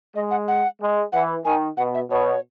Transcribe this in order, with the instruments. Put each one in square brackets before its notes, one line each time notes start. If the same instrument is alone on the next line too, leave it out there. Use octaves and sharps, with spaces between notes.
[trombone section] G#3 [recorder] D#5
[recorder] F#5
F#5
[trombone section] G#3
[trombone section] E3 [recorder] F#5
[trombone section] D#3 [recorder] G#5
[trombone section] B2 [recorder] F#5
[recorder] E5
[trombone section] B2 [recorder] C#5